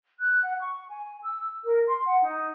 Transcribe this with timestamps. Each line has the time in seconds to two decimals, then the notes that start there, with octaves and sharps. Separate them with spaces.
0.20 F#6
0.42 F#5
0.59 C#6
0.88 G#5
1.23 E6
1.64 A#4
1.88 C6
2.07 F#5
2.21 D#4